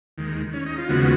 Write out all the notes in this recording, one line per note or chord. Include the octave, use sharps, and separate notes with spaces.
D#2 D#3 G#3
C#4
D#4
F4
D#2 C#3 F3 G#3 B3 F#4